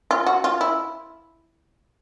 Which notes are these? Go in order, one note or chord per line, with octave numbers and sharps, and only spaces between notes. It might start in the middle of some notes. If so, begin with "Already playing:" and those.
F4
F#4
F4
E4